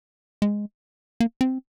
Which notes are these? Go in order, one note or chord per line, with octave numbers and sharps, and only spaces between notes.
G#3
A#3
C4